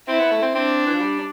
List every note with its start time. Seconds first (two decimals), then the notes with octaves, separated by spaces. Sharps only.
0.08 C4 E4
0.20 B3
0.31 A3
0.42 C4
0.55 C4 D4
0.86 E3
0.94 F3
1.00 G3